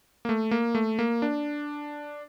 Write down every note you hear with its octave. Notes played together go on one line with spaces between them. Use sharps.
A#3
A3
A#3
A3
A#3
D4